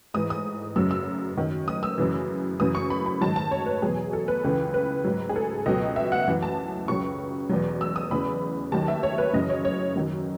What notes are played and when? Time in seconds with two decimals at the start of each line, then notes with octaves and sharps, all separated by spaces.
0.14 G#2 E3 D#6
0.30 D#6
0.76 F#2 C#3 F#3 E6
0.91 E6
1.37 F#2 D#3 F#3
1.68 D#6
1.83 E6
1.98 F#2 C#3 E3
2.60 F#2 C#3 E3 D#6
2.75 C#6
2.90 B5
3.06 B5
3.21 G#2 D#3 F#3 A5
3.36 A5
3.51 C#5
3.66 B4
3.82 E2 B2 F#3 G#4
4.13 A4
4.28 B4
4.44 C#2 C#3 E3
4.74 B4
5.05 G#2 F#3
5.29 G#4
5.36 A4
5.66 C#2 B2 F#3 D#5
5.96 E5
6.12 F#5
6.27 F#2 E3
6.42 A5
6.88 C#2 C#3 F#3 C#6
7.49 E2 B2 F#3
7.81 E6
7.96 D#6
8.11 E2 C#3 E3 B5
8.72 D#2 D#3 F#3 A5
8.88 E5
9.03 C#5
9.18 B4
9.33 F#2 C#3 E3 D#5
9.49 C#5
9.65 C#5
9.96 F#2 D#3 F#3